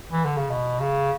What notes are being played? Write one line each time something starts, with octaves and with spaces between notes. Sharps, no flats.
E3
D3
C#3
B2
C#3